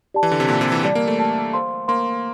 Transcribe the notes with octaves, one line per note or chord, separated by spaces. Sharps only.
G4 D5 A5
E3
D3
C3
A#2 G4 D5 A5
C3
E3
G3 G4 D5 A5
A#3
A3
G4 D5 A5
C5 F5 C6
A#3 C5 F5 C6